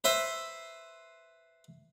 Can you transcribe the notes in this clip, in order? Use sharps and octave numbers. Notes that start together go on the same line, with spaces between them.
B4 C5 E5